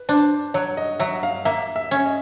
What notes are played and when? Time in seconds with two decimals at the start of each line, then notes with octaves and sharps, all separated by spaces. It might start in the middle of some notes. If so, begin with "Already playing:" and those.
Already playing: B4
0.09 D4 C5
0.54 F#3 C#5
0.77 D#5
0.99 F#3 E5
1.23 F5
1.45 A#3 E5
1.76 E5
1.91 C#4
2.06 D#5